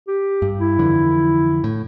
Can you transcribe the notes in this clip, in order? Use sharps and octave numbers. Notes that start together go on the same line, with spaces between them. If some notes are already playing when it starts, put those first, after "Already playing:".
G4
G2
E4
F2 D3 E3
A2